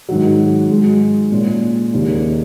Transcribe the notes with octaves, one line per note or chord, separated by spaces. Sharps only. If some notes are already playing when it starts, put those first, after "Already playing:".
G#2 D#3 F#3
G#2 G#3 F#4
A#2 G#3 C#4
D#2 C#3 A#3 D#4